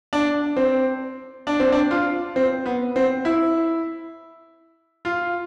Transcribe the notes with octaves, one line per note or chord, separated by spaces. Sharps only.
D4
C4
D4
C4
D4
F4
C4
B3
C4
E4
F4